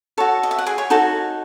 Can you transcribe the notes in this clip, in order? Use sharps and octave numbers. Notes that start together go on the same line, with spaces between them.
F#4 A4 C#5 A5
D#5
E5
F#5
G#4 G#5
C#5 C#6
D#4 F#4 A4 C#5 A5